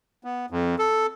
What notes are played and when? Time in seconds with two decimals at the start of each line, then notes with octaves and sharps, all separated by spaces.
0.24 B3
0.50 F2
0.79 A4